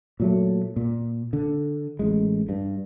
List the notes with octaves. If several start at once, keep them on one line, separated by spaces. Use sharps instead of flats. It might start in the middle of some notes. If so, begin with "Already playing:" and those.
A#2 F#3 A3
A#2
D3
A1 G#3
G2